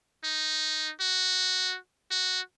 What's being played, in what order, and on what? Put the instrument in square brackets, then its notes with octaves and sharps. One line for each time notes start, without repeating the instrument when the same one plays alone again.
[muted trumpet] D#4
F#4
F#4